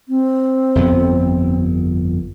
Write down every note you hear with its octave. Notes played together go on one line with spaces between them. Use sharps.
C4
G1 F2 B3